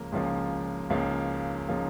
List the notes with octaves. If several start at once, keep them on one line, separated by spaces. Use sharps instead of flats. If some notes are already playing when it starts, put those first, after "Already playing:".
Already playing: C#2 C#3 F3 A#3
C#2 C#3 F3 A#3
C#2 C#3 F3 A#3
C#3 F3 A#3